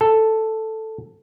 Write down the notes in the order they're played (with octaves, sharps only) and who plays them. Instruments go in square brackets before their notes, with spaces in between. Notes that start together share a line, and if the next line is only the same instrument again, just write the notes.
[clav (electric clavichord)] A4